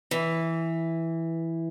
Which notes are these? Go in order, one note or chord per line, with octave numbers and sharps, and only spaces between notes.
E3